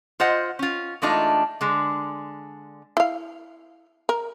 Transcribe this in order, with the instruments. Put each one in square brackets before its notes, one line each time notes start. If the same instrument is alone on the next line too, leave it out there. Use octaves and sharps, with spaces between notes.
[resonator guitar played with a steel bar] F4 C5 D#5 F#5
C#4 F4
E3 G#3 A3 D4 D#4 F4
D3 G#3
[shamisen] E4 F5
A#4